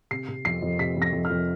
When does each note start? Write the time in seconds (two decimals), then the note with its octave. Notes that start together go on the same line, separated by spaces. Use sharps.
0.11 C3 C7
0.28 C3
0.45 F2 C7
0.62 F2
0.79 C3 B6
0.97 F2
1.02 A#6
1.13 F2
1.25 F6
1.30 F2